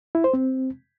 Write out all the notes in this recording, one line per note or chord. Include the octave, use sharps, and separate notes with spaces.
E4
C5
C4